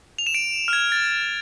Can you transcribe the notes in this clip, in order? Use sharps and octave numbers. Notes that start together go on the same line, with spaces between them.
F7
E7
D7
F6
G#6
A6